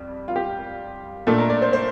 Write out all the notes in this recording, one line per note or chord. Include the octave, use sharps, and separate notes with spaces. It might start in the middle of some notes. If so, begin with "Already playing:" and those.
Already playing: F2 G3
F4
G4
A#2 A3 D4 A4
A#4
D5
C5
C5